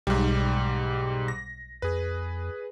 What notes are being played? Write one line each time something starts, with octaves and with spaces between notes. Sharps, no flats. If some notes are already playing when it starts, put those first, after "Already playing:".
B1 G#2 B2 G3
A#6
F2 G#4 B4